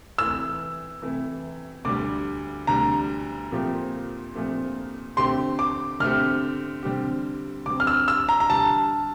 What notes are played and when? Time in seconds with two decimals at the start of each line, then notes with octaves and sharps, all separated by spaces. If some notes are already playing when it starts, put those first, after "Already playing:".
0.18 C3 E3 A3 E4 E6
1.02 C3 E3 A3 E4
1.85 D2 D3 G3 D6
2.67 D2 D3 G3 A#5
3.51 A#2 F3 A3 C4 G4
4.34 A#2 F3 A3 C4 G4
5.17 D3 A3 C4 G4 C6
5.59 D6
6.00 D3 A3 C4 G4 F6
6.83 D3 G3 C4 G4
7.66 D3 G3 C4 G4 D6
7.80 F6
7.87 E6
8.08 E6
8.29 A#5
8.40 A#5
8.49 D3 G3 D4 G4 A5